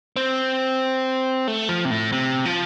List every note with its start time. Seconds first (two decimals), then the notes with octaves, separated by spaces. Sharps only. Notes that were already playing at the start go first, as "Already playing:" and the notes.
0.16 C4
1.48 A3
1.69 F3
1.85 C3
1.91 A2
2.12 C3
2.45 F3